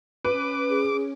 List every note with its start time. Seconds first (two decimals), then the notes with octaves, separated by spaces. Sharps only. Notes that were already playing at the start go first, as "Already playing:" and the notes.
0.25 C#4 B4 D6
0.70 G#4